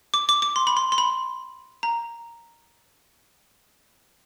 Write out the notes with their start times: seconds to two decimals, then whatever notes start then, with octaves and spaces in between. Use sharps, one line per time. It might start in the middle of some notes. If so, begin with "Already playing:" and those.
0.14 D6
0.29 D6
0.42 D6
0.56 C6
0.67 B5
0.77 C6
0.92 C6
0.98 B5
1.83 A#5